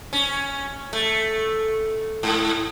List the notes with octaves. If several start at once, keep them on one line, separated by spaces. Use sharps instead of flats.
C#4
A3
G#2